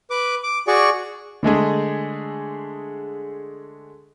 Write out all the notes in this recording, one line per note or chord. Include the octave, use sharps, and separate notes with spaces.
B4 D6
D6
F#4 G#4 D5 C#6
D3 G#3 A3 G#4